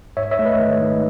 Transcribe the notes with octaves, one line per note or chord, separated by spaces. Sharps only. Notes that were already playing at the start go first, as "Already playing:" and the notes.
G#2 C#5 E5
C#5 E5
A3
B4 D#5
D#3
G#2